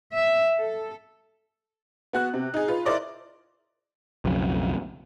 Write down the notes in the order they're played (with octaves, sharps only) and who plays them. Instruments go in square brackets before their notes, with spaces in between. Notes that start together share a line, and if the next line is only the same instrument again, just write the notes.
[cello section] E5
A4
[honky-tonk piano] B3 F#4 F#6
C3
D#4 G#4
F4 B4
E4 A#4 C5 D5 D#5
[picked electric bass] B1 F2 C#3